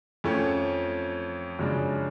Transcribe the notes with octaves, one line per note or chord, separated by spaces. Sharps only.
F2 F3 A3 C#4
F#2 C#3 F3 G#3 D4